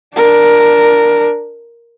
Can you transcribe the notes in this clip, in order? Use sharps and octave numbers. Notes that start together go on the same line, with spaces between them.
D4 A#4